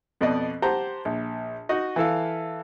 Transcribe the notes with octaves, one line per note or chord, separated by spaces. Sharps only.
F2 B2 D5 D#5
G4 C5 F#5 A5 A#5
A#1
D#4 F#4 D#5
E3 E4 A4 F5